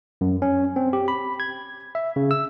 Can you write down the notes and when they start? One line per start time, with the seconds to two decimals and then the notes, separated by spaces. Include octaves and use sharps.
0.21 F#2
0.42 C#4
0.76 C4
0.93 G4
1.08 B5
1.40 G#6
1.95 E5
2.16 C#3
2.31 E6